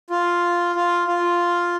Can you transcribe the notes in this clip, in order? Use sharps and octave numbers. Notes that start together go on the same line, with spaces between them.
F4
F4
F4